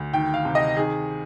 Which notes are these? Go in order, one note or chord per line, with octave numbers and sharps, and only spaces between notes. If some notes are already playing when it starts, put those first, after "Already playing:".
Already playing: D2
D#3 G5
F5
C3
D#5
D#3 G#4